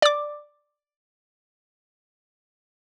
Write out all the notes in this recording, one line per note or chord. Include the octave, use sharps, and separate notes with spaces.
D5 D6